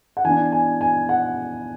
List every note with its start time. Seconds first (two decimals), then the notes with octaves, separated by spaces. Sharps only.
0.17 F#5
0.24 E3 B3 D4 G#5
0.53 G#5
0.81 G#5
1.09 F#5